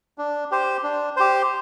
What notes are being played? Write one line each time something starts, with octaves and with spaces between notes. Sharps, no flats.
D4
G4 C5
D4
G4 C5